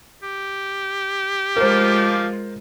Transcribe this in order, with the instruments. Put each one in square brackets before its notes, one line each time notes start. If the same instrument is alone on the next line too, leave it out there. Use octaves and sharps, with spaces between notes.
[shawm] G4
[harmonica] F3 F5 D6 [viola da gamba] G#3 F4 [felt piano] A#4 C5